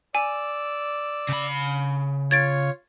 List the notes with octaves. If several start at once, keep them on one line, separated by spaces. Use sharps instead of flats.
D5 G#5 E6
C#3 B5
F4 C#5 G#6 A6 D7